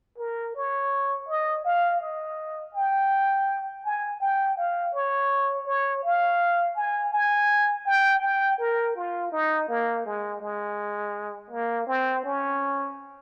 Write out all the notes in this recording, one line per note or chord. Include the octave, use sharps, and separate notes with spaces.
A#4
C#5
D#5
F5
D#5
G5
G#5
G5
F5
C#5
C#5
F5
G#5
G#5
G5
G5
A#4
F4
D#4
A#3
G#3
G#3
A#3
C4
C#4